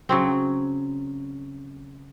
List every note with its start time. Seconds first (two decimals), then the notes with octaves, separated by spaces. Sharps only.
0.09 C#3 F#3 C4